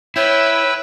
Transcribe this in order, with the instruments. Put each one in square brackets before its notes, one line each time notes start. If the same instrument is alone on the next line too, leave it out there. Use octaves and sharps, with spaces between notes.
[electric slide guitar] E4 [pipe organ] B4 G5 E6 [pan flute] C#5